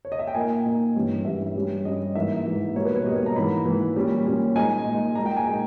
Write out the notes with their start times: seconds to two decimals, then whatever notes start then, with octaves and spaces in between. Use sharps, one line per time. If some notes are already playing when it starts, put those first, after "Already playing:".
0.05 C#5
0.12 D#5
0.19 E5
0.27 G5
0.34 A#2 A#3 D#4 G#5
0.66 A#2 A#3 D#4
0.96 G2 E3 G3 C#4
1.25 G2 E3 G3 C#4 E5
1.55 G2 G3 C#4
1.85 G2 G3 C#4 D#5
2.15 G#2 E3 A#3 E5
2.46 G#2 E3 A#3
2.75 B2 G3 A#3 D#4 C#5
2.85 B4
2.96 C#5
3.06 B2 G3 A#3 D#4 D#5
3.16 C#5
3.26 A#5
3.36 G#2 E3 A#3 B5
3.65 G#2 E3 A#3
3.96 A#2 G3 C#4
4.26 A#2 G3 C#4
4.55 A#2 G#3 D#4 G#5
4.86 A#2 G#3 D#4
5.15 A#2 G#3 D#4 A#5
5.26 G5
5.37 G#5
5.47 A#2 G#3 D#4